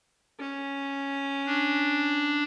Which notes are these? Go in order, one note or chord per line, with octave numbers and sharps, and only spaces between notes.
C#4
D4